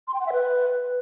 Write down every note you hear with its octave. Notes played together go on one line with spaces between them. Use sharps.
C6
G5
F#5
E5
B4